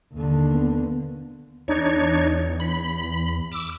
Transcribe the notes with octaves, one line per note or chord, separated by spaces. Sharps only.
D#2 D3
B3
E2 D4 D#4 C#5
B5
D6 E6